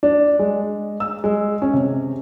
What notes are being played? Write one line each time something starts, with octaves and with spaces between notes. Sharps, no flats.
D4
G#3
E6
G#3
C#4
C3